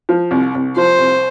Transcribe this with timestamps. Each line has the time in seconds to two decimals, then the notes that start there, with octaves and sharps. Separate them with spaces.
0.09 F3
0.31 C2
0.54 C2
0.77 F3 C5
0.98 C2